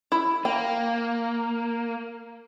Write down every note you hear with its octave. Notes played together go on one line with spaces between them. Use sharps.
E4
A#3 G5